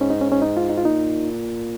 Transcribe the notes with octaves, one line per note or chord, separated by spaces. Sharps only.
G#2 C#4
D#4
C#4
C#4
D#4
F4
D#4
F4
A#2 D#4